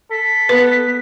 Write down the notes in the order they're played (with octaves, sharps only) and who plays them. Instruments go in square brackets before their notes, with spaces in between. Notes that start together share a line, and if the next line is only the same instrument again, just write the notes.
[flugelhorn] A4 [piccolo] B6
[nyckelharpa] B3 [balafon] B4